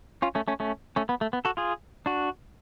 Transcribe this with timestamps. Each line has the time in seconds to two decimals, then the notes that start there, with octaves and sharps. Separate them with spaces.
0.22 C#4 F4
0.35 A3 C#4
0.48 A3 C#4
0.60 A3 C#4
0.96 A3 C#4
1.09 B3
1.21 A3
1.33 B3
1.45 F#4 A4
1.57 F4 G#4
2.06 D4 F#4